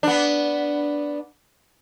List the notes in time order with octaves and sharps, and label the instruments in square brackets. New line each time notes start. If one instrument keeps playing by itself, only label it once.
[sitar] B3 D4